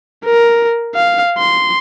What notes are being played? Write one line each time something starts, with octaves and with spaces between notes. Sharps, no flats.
A#4
F5
C6